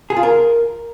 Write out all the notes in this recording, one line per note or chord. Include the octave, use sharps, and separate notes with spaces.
G#4
F4
A#4